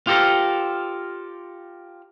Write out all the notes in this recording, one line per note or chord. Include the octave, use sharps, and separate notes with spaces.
F4 G4 A4 A#4 C5